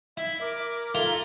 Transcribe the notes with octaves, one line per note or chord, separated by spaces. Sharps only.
E4 E5
A#4 D6
E4 F4 A4 A#5 G7